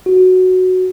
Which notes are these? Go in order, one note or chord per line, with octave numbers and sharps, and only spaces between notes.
F#4